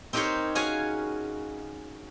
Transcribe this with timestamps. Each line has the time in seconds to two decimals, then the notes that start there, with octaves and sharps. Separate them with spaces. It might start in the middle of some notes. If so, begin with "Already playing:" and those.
0.13 C4 D#4 G4 A#4 C5 C#5
0.55 C#4 F#4 G#4 F5 G#5